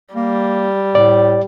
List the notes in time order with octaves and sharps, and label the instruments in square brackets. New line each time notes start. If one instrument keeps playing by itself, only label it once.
[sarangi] G3 [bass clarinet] A#3
[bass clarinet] A2 [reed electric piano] D5